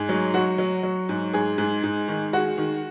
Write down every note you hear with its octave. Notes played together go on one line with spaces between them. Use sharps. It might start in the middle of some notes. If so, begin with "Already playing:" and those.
Already playing: G#2 G#4
F#3
F#3 F#4
F#3
F#3
G#2
G#2 G#4
G#2
G#2
D#3
G#3 F#4
D#3